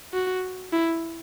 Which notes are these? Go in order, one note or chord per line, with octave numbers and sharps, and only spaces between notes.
F#4
E4